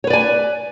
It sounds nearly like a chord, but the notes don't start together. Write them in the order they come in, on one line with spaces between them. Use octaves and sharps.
C#5 B4 D5 G#5